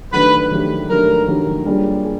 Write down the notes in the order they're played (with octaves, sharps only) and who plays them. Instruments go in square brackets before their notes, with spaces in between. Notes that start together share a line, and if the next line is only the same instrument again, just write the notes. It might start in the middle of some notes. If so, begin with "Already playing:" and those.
[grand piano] D#3 F#3 A3 D4 G4 [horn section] B4
[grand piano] D#3 F#3 A3 D4 G4
[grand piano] D#3 F#3 A3 D4 G4 [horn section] A#4
[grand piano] D#3 F#3 A3 D4 G4
G3 A#3 D4 F4 G#4
G#4